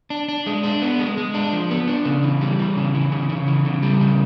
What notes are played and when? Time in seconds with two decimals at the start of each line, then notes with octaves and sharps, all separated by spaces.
0.10 D4
0.28 D4
0.46 G#3
0.63 D4
0.82 B3
0.99 G#3
1.18 G#3
1.34 D4
1.53 F3
1.71 B3
1.88 D4
2.05 C#3
2.23 E3
2.41 G3
2.59 E3
2.76 C#3
2.95 E3
3.12 C#3
3.30 C#3
3.47 E3
3.65 C#3
3.82 G3
4.01 C#3